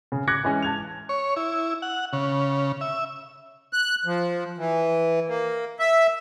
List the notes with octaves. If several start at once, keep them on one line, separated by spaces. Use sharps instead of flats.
C#3
D6 F#6 G#6 A#6 C#7
E3 G#3 C#4
A5 G#6 F7
C#5
E4
F#5
C#3
E5
F#6
F3
E3
A#3
E5